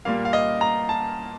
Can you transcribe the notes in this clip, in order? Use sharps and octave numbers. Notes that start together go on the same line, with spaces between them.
A#2 G3 A#3 F5
F5
D#5
A#5
A5